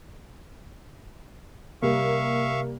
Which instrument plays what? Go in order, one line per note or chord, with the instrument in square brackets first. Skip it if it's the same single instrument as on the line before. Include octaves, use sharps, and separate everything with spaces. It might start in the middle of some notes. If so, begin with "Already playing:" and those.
[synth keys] C3 [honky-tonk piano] G3 A#3 [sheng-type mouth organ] E5 F5 C#6